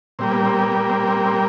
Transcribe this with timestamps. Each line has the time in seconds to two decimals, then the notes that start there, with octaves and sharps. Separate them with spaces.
0.19 A#2 G3 A#3 C4
0.32 B3
0.45 C4
0.59 B3
0.72 B3
0.89 C4
1.07 C4
1.25 C4